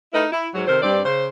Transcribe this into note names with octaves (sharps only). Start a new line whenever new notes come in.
A3 D#4 E4 A#4 B4 D#5
E4
G#2 F#3
C3 D#3 A4 A#4 C5
G2 C4 D5
C#3 C5